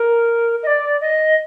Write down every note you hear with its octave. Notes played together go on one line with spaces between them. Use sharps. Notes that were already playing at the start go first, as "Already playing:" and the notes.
Already playing: A#4
D#5
D5
D#5